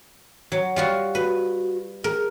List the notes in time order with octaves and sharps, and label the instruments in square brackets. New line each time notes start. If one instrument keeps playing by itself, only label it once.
[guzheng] F#3
G3 F4 F#4
[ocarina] F#4 [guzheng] B4
[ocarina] G#4 [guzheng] A#4